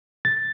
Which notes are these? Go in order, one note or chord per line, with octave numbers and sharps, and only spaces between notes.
A6